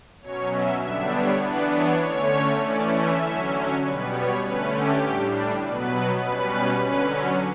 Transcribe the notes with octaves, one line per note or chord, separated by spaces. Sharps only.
B2 F#3 C#4 C#5
E5
D3 G3 B3 D4 E5
C#5
E3 B3 D4 B4
C#5
D3 A3 C#4 C#5
E3 A3 C#4 D5
E5
D3 F#3 C#4
C#5
B2 G3 B3 B4
C#5
D3 A3 C#4 B4
G4
A2 G3 D4
B2 F#3 B3 B4
B2 G3 C#4 B4
D3 F#3 C#4 B4